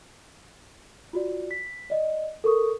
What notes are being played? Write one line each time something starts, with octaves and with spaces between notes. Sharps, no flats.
F4 F#4 D5
B6
D5 D#5
A4 A#4 C#6 D#6